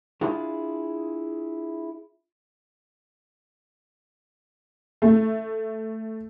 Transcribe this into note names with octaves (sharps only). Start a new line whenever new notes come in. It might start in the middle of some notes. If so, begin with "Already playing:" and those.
D4 E4 F4 G#4 F5
A3